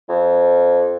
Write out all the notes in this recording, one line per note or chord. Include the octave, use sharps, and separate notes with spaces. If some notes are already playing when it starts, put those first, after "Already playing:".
F2